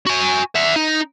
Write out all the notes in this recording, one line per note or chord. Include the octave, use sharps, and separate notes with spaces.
F#4 G#5
E5 F#5
D#4